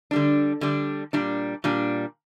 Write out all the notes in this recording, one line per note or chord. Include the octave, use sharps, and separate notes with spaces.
D3 G3 D4
D3 G3 D4
A#2 G3 D4
A#2 G3 D4